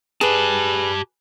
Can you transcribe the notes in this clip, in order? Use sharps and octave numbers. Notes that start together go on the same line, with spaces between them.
G4 G#4 B4 A5